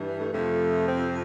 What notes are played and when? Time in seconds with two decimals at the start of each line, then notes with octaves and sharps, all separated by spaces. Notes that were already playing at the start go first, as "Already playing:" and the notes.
Already playing: G2 E3
0.18 A3
0.32 F2 C3 F3 A3
0.86 C4